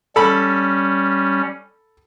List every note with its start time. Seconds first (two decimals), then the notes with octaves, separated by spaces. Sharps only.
0.16 G3 C#4 A4 B5